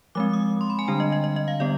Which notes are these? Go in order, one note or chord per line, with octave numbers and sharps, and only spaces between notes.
F3 G#3 C4 D6
D#6
C6
B5
G#5
D3 G3 D4 G5
D#5
D#5
D#5
D#5
F5
D3 G3 B3 D5